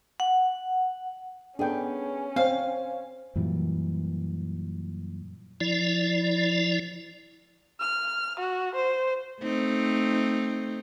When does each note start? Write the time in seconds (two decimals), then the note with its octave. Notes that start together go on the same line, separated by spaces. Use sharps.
0.20 F#5
1.59 B3 C#4 D4 G#4 A4 G5
2.36 C4 C5 F5
3.36 F#2 A#2 E3 G3
5.61 F3 E4 D5
7.80 F6
8.40 F#4
8.75 C5
9.42 A3 C4 D#4